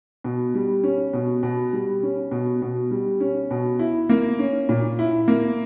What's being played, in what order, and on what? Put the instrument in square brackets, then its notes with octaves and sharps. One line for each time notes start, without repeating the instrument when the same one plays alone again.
[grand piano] B2
G3
C#4
B2
B2
G3
C#4
B2
B2
G3
C#4
B2
E4
A#3
C#4
A#2
E4
A#3